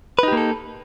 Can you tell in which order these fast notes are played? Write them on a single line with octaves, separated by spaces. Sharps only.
B4 D#4 G4 A#3 A4